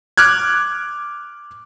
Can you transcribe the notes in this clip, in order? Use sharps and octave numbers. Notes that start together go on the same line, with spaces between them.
D6 F6 F#6 G#6